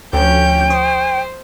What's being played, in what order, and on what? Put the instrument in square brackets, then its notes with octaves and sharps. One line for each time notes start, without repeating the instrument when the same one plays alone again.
[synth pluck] D2 [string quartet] F3 C#4 G6 [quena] G5
[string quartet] C5 [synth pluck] C#6 D#6